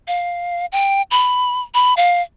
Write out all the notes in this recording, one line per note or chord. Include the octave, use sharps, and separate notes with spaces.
F5
G5
B5
B5
F5